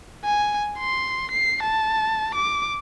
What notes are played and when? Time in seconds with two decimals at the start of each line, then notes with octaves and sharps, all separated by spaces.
0.24 G#5
0.78 C6
1.31 C7
1.63 A5
2.35 D6